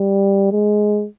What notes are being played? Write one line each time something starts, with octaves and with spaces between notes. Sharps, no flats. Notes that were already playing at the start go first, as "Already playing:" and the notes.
Already playing: G3
G#3